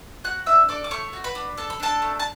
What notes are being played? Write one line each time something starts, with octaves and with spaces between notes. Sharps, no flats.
F#4 F#5 F#6
D4 E5 E6
A4 D5 D6
D6
A3 C#5 C#6
F#4
B4 B5
D4
A4 A5
B5
D4 A4 A5
A3
A5